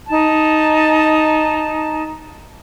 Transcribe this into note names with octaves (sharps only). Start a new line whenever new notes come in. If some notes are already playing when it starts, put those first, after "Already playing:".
D#4 A5